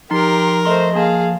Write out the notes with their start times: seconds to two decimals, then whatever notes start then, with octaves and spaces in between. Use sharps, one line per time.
0.11 F3 D#4 G4 A#4 C6
0.65 A3 C5 D#5 C6
0.95 A#3 G#4 F5 A5